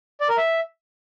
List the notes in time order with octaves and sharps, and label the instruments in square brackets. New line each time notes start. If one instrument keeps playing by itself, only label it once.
[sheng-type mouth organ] D5
A#4
E5